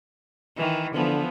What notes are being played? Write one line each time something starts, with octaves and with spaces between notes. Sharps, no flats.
D#3 E3
D3 E3 F3 B3